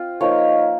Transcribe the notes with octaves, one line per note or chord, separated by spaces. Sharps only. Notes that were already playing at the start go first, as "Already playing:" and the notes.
Already playing: C4 F4
F3 A#3 D#4 C#5